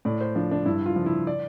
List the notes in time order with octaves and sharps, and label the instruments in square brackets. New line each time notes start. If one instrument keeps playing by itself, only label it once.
[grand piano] A2 D5
C5
F3 D4
D4
G2 E4
F4
F3
E4
D5